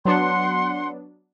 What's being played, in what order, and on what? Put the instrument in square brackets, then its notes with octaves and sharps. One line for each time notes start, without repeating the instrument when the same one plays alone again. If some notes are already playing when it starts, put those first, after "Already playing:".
[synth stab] F#3 B3 D4 [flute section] F#5 C6